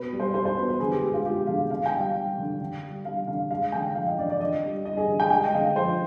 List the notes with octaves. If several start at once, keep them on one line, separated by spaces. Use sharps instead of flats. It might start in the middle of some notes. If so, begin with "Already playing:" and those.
Already playing: B2 B4
G3
C5
G3 C5
C5
B2 B4
B4
D3 G#4
G4
G#3 G4
F4
G#3 G4
D3 F5
D3 F5
G5
G3
F5
G3
D3
D3
G3
G3 F5
D3 F5
G#3 F5
D3 G5
F3 F5
D#5
D3 D5
D5
D3 D#5
G3
G3 D#5
G#4
D3
G5
G#3 G5
D#5
D3 F5
F3 C5